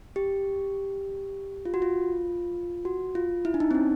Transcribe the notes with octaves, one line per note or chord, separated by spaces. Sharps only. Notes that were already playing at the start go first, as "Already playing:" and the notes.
G4
F4
F#4
F4
F#4
F4
E4
D4
D#4
C4
C#4